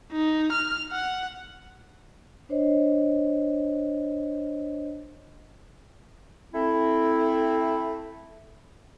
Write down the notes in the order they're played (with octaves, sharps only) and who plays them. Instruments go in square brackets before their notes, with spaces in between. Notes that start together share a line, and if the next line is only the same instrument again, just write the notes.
[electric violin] D#4
F6
F#5
[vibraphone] D4 C5 C#5 D#5
[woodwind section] A3 C4 E4